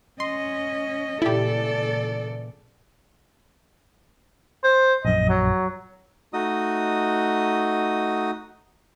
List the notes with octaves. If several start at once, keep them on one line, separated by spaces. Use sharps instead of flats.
C#4 D#5 C6
A#2 C#3 E3 E4 G4 A4 D5
C5
A#1 F#2 D#5
F#3
A3 D#4 F#4 D#5 D#6